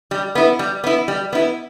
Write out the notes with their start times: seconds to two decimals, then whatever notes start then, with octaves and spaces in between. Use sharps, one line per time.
0.11 G3
0.35 B3 E4
0.59 G3
0.84 B3 E4
1.08 G3
1.33 B3 E4